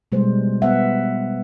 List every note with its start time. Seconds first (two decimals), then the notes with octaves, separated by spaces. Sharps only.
0.12 B2 G3 G#3 C5
0.62 B3 E5 F#5